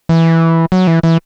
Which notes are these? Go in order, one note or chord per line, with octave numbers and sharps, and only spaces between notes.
E3
F#3
E3
E3